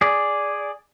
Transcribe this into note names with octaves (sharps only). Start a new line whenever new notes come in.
G#4 D5